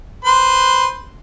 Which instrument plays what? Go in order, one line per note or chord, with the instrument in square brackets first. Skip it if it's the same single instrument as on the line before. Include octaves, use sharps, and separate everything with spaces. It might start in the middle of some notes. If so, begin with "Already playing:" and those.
[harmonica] B4 C5 C6